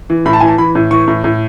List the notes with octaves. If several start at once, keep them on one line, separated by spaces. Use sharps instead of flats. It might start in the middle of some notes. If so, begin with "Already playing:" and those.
E3
A2 B5
A5
E3 G#5
A5
E3 B5
A2
E3 C#6
A2
A2